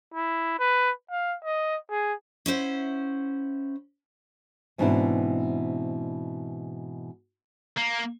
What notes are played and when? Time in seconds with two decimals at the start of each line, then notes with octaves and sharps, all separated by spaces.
0.14 E4
0.59 B4
1.11 F5
1.44 D#5
1.90 G#4
2.46 C#4 E4 C5 F#5
4.78 G#2 B2 E3 C4 D4 E4
7.77 A#3